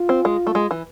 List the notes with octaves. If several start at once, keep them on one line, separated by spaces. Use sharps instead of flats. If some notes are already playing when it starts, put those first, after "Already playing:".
Already playing: F4
C4
G#3
A3
G#3
E3